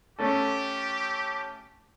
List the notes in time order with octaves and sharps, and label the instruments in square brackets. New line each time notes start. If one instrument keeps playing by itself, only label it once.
[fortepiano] A3 C#4 A4 [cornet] G4